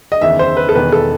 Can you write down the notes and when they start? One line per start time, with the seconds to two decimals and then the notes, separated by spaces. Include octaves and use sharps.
0.12 D#5
0.21 F#1 E2 D#3 E5
0.39 C5
0.57 B4
0.69 A4
0.75 E1 E2 D#3 B4
0.92 A4